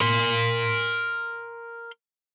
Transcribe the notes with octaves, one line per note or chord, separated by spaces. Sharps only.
A#4 C6